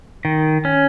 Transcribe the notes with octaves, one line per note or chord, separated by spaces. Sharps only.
D#3
C#4